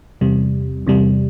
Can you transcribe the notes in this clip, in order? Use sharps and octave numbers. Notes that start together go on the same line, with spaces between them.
E2 C3 G3
E2 C3 G3